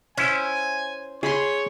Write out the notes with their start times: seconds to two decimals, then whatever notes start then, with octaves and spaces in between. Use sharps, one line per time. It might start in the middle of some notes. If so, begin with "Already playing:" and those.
0.17 C#4 E4 C5 G#5
1.23 G#4 C#5 B5 C6